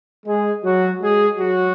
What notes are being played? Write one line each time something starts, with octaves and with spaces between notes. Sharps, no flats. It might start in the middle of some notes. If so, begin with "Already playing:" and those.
G#3 G#4
F#3 F#4
G#3 G#4
F#3 F#4